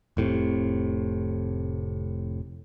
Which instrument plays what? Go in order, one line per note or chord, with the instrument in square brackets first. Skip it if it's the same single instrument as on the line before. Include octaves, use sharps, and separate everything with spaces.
[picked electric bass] F1 A2 C3